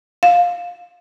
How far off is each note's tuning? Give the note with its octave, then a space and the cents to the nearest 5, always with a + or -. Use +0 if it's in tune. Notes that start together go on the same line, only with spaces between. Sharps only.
F5 +10